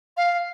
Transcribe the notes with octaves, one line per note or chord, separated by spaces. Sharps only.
F5